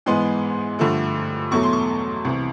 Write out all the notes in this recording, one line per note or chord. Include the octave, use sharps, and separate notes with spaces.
G#2 E3 G#3 B3 C6
G2 D3 F3 A3
E2 B2 F#3 A3 C#6
C6
C#6
C2 C3 E3